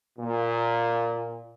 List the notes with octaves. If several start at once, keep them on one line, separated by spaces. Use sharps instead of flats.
A#2